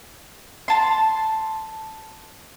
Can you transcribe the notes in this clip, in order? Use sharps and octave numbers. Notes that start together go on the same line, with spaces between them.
A5 C6